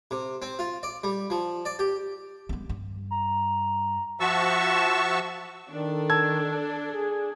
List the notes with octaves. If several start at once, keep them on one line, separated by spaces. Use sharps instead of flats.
C3
C4
F4
D5
G3
F3
D5
G4
G#3 B3
G2
A#5
F3 F#4 E5 A5 C#6 E6
D#3 D4 A4
A5 E6 G#6
G#4